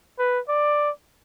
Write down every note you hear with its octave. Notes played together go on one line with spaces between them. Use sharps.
B4
D5